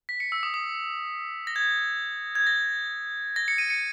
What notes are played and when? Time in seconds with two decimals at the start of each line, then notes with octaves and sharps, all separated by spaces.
0.09 B6
0.20 C#7
0.32 E6
0.43 D#6
0.54 D#6
1.47 A#6
1.56 G#6
2.35 G#6
2.47 A#6
3.36 A#6
3.48 C#7
3.58 D#7
3.70 C#7